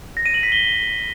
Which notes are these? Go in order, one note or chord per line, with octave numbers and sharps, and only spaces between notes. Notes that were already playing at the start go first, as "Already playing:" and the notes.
A#6
D#7
F#7
B6
G7